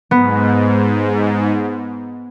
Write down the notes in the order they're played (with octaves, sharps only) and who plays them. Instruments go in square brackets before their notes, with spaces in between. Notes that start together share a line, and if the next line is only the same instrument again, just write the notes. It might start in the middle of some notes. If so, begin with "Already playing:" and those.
[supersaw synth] G#2 [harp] B3